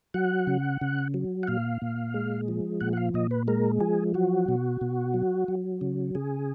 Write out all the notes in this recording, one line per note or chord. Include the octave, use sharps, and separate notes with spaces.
F#3 F#5
C#3
C#3
F#3
F#5
A#2 F5
A#2
G#3
F3
A#2 F#5
F#5
F5
A#2 D#5
B4
G#3 A#4
F3 G#4
F#3 F#4
B2
B2
F#3
F#3
C#3
C#3 G#4